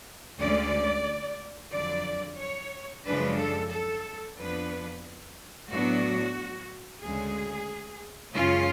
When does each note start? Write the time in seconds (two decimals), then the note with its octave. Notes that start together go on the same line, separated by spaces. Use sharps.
0.41 D2 D3 G#3 C#4 D5
1.73 F2 D3 F#3 D5
2.40 C#5
3.06 F#2 C#3 F3 G#3 D4 B4
3.39 A4
3.72 A4
4.39 F2 F3 B3 D4 B4
5.70 A2 F#3 B3 D4 F#4
7.03 D2 C#3 G#3 G#4
8.36 F#2 C#3 G#3 C#4 F4